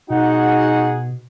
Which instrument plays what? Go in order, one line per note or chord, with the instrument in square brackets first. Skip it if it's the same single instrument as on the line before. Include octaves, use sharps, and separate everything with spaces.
[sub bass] B2 [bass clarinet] D#4 [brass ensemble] F#4 G#4 F#5